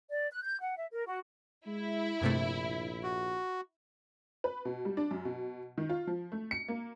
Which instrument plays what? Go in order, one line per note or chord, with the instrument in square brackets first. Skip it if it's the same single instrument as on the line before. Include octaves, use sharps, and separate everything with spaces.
[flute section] D5
F#6
G6
F#5
E5
A#4
F#4
[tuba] G#3 [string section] E4
[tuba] A#1 [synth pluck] G2 C3 A3
[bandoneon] F#4
[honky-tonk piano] B4
B2
G3
D4
F#2
B2
D#3
F4
F3
A3
C#7
A#3